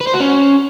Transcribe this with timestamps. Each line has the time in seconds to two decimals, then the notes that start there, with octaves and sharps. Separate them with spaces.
0.01 B4
0.07 C5
0.14 F#4
0.20 C#4